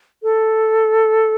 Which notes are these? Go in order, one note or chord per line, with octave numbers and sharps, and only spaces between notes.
A4